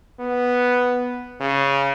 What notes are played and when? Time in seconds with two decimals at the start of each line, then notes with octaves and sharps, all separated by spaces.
0.20 B3
1.41 C#3